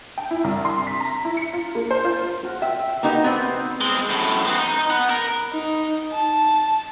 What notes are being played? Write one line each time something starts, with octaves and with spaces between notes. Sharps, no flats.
G5
E4
C2
C6
B6
A#5
E4
C#7
F4
A#3
C5
F4
F4 F#4
E5 G5
A#3 D#4 F#4 G4 B4
B3 C4
G#3 C4
F#2 A2
B3 C4
D#4
B3 F#5
A#4
D#4
A5